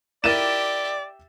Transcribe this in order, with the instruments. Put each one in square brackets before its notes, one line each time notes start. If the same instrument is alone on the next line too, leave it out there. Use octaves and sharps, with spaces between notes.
[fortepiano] E4 A#4 [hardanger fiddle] G4 E5 [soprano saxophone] D5 [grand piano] A6 D#7 E7